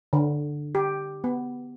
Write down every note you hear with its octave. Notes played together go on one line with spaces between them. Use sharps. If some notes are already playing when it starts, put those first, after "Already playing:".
D3
G4
B3